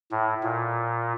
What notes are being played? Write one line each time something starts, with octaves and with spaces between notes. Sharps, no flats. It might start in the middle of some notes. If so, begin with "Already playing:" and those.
A2
A#2